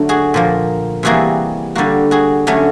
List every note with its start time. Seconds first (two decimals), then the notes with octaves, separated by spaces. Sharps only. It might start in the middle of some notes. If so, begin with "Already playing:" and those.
Already playing: D3 F#3 A3
0.09 F#4 G#4
0.34 A#2 F3 A#3
1.03 C3 E3 G3 A#3 F#4 G#4
1.75 D3 G3 A#3 F#4
2.11 F#4 G#4
2.47 D3 F#3 A3 C#4